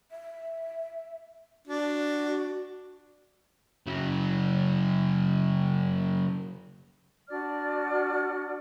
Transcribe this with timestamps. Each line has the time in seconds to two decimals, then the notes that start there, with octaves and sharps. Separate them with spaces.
0.11 E5
1.67 D4 F#4
3.87 C#3 F#3
7.29 D4 F#4 D5 F6